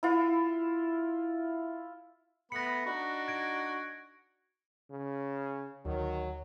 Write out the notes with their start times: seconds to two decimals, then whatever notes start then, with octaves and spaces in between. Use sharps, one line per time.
0.03 E4 F4
2.52 A3 B3 B5 A#6 C#7
2.86 D4 D#4 F#4
3.28 G#6 D7
4.90 C#3
5.85 D2 D#3 F#3